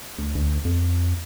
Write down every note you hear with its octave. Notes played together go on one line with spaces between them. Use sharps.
D2
D2
F2